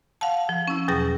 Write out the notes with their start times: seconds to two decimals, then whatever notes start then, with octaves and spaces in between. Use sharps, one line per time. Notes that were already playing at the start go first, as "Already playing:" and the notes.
0.21 F5 F#5 A5
0.49 F3
0.68 C#4 E4
0.88 E2 B2 F#3 G#4 G5 A#6